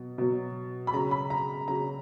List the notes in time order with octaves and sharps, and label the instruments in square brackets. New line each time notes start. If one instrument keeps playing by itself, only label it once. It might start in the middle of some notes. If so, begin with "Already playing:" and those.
Already playing: [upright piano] B2 F#3
B2 F#3
B5
C#3 F#3 A#5
B5
A#5
C#3 F#3 A#5